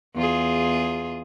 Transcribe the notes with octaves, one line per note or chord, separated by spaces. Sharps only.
E2 F4 G#4